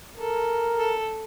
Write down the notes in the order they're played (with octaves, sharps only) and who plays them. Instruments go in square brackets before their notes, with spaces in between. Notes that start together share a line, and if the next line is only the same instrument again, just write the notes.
[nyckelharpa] A4 [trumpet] A#4
[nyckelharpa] A4